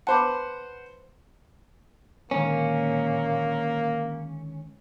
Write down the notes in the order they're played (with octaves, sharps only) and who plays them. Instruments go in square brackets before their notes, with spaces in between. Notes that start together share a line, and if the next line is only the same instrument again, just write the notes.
[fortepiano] B4 C5 F#5 [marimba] A5 B5 D6
[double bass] A#2 [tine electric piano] D3 D#3 G#3 [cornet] A#3 [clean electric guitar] C#4